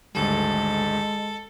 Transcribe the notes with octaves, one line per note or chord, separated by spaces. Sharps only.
G#1 D2 G3 G#3 A4